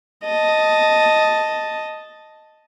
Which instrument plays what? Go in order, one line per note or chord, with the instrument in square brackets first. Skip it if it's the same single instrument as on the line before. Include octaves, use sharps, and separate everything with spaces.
[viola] D#5 A5